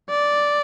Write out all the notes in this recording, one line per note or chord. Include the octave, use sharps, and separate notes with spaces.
D5